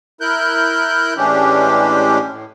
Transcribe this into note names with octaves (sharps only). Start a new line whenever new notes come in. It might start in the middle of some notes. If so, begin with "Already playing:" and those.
E4 A#4 F#6 G6
A2 E3 G#3 C#4 D4 G4
A2